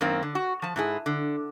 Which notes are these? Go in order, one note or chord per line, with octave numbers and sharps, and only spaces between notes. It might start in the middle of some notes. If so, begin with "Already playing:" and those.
F#2 D#3 A#3 C4
D3
F#4
F3 A5
G#2 E4 G#4
D3